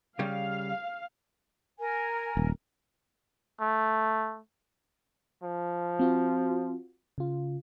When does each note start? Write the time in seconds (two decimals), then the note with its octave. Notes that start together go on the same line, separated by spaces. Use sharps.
0.19 C#3 G3 F5
1.78 A#4 G#5
2.37 D#1
3.61 A3
5.43 F3
5.99 C4 F4 F#4
7.18 C#3 F4